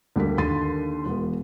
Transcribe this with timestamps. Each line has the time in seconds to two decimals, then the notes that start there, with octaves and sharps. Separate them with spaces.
0.16 D2 G3 A#3 B6
0.38 D#2 D3 C6 A6 D#7
1.06 E1 B3